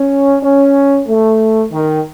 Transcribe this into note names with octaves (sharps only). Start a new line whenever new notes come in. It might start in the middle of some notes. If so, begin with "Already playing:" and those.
Already playing: C#4
C#4
A3
D#3